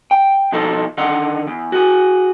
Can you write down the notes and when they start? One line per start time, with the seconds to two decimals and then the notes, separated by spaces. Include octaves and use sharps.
0.11 G5
0.52 B2 F3 D#4 A4
0.98 D3 D#3 D#4 F#5
1.47 E2
1.72 F#4 G#4